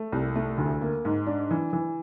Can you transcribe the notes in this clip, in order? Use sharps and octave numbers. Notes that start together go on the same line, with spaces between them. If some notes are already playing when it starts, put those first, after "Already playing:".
Already playing: A3
C2
A3
D2
A#3
G#2
D4
E3
E3